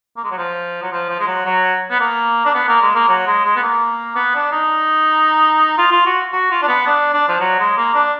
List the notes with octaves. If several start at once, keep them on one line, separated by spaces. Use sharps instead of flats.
A#3
G#3
F#3
F3
F#3
F3
F3
G#3
F#3
F#3
B3
A#3
D4
B3
A#3
G#3
A#3
F#3
G#3
G#3
B3
A#3
B3
D4
D#4
F4
F4
F#4
F#4
F4
D4
B3
D4
D4
F3
F#3
G#3
A#3
D4